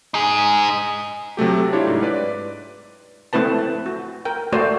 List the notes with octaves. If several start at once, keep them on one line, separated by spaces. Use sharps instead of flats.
D#4 G#4
C3 F#3 A3 G4
D4 E4 F4 G4 C#5
G#2
B4 D5
A3 C4 E4 B4 A5
F#4
A#4 G5
A3 F#4 C5 D5